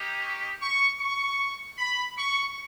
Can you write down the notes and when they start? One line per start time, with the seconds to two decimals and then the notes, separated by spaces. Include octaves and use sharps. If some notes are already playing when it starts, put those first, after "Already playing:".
Already playing: A#3 D#4 G4
0.21 C#6
0.60 C#6
1.00 C#6
1.78 B5
2.17 C#6